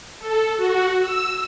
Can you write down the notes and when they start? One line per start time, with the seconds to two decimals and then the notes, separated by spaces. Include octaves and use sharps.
0.19 A4
0.57 F#4
1.01 E6